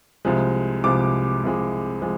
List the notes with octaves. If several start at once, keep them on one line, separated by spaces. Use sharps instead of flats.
C2 C3 F3 G#3
C2 C3 F3 G#3 D6
C2 C3 F3 G#3
F3 G#3